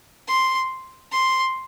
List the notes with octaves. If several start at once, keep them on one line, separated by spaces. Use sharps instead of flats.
C6
C6